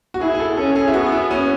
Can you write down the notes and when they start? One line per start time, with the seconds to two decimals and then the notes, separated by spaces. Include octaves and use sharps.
0.14 F#4
0.21 E4 G#4
0.34 G#4
0.40 A4
0.57 C#4 A4
0.76 G#4
0.88 E4
0.94 B3 F#4
1.12 E4
1.31 C#4